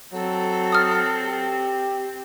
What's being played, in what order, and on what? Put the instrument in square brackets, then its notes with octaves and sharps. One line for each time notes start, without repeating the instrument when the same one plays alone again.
[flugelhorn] F#3 [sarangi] C4 [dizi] A4
[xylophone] D#6 F6
[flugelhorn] G4